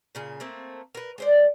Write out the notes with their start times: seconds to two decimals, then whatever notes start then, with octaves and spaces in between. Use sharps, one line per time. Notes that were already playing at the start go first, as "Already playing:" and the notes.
0.15 A#2 C#3 G#4
0.40 A3 A#3 C4
0.95 A#4 B4
1.18 G#3 C5 D5